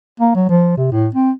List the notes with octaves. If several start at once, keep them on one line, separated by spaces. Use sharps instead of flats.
A#3
F#3
F3
C3
A2
C4